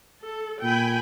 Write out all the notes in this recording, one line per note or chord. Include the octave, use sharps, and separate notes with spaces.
A4
A#2 G5 G#5 B5